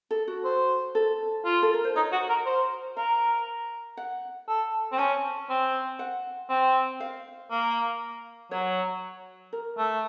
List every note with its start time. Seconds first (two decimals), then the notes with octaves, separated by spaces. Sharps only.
0.11 A4
0.28 F#4
0.45 C5
0.95 A4
1.45 F4
1.62 A4
1.74 A#4
1.84 C5
1.96 D#4 C#5
2.12 F#4
2.29 A#4
2.46 C5
2.97 A#4 F5
3.97 F#5
4.48 A4
4.92 C4
4.98 C#4 A5
5.49 C4
5.99 F#5
6.49 C4
7.00 F5
7.51 A#3
8.51 F#3 C#5
9.53 A#4
9.78 A3